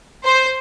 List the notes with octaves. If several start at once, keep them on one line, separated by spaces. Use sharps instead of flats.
C5